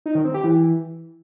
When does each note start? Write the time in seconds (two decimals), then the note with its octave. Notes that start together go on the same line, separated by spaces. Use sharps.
0.06 D#4
0.15 D#3
0.25 C4
0.34 G4
0.44 E3